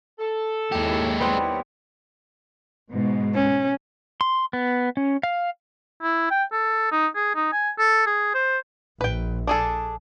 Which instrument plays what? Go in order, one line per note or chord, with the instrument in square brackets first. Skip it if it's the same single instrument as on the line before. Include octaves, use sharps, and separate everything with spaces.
[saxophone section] A4
[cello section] D#2 E4 C#5 [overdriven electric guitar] G#3 G4
[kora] G3 B3 C4
[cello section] G#2 B2
[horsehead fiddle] C#4
[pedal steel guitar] C6
B3
C#4
F5
[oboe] E4
G5
A4
D#4
G#4
D#4
G#5
A4
G#4
C5
[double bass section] A#1 [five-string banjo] B4 G5
[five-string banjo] D4 G#4 A4